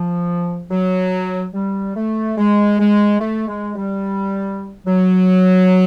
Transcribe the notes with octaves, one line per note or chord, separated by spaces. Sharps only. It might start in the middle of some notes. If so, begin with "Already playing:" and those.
Already playing: F3
F#3
G3
A3
G#3
G#3
A3
G#3
G3
F#3